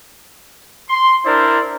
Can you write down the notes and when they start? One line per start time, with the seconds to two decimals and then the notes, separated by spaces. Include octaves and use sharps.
0.89 C6
1.25 D4 E4 A#4 C5 D5